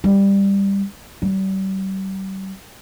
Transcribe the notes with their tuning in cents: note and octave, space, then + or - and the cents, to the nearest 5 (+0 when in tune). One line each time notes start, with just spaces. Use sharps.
G3 +15
G3 -40